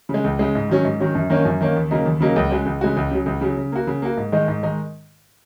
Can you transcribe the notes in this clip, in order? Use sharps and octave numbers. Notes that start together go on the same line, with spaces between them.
C#3 G#3
C#2
C#3 G#3
G#2
D#3 F#3 C#4
G#2
D#3 F#3 C#4
F#2
D#3 A#3 C#4
F#2
D#3 A#3 C#4
D#2
C#3 F#3 A#3 D#4
D#2
C#3 F#3 A#3 D#4
C#2
C#3 G#3 F#4
C#2
C#3 G#3 F#4
C#2
C#3 F#3
C#2
C#3 F#3
C#3
A#3 F#4
C#3
A#3 F#4
G#2
D#3 G#3 D#4
G#2
D#3 G#3 D#4